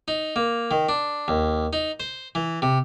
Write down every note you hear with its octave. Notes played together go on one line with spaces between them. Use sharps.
D#4
A#3
D#3
D4
D#2
D#4
C5
E3
C3